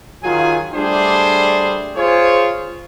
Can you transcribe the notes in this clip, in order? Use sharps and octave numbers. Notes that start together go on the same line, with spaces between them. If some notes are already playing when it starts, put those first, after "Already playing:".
D#3 F#3 F4 G#4 G#5
G3 A3 D4 G#4 C5
F4 G#4 C5 C#5